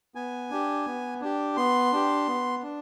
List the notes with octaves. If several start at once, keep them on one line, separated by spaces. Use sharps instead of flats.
B3 G#5
D4 G4
B3
D4 G4
B3 C6
D4 G4
B3
D4